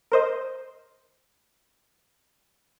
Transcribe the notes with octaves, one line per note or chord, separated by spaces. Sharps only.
A#4 C5 D#5